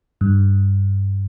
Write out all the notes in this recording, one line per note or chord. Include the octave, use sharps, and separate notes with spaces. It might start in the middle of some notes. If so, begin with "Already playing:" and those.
G2